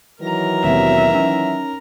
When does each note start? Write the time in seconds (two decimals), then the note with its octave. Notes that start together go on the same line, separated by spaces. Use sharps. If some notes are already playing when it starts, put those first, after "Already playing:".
0.21 D#3 E3 F#3 A#4 A#5
0.64 D#2 B2 C4 E5
1.14 C#4 D#4